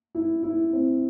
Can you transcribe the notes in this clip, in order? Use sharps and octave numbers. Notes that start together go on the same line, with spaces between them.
E4
E4
C4